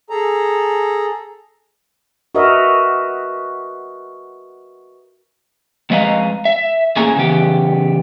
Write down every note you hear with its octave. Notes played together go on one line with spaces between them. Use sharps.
G#4 A4 A#5
F#4 A#4 B4 D#5 E5
F2 G#3 B4 D#5 F5 A#5
E5
A2 A#3 C#4 G#4 G#5 A#5
C#3 E3 B3 G4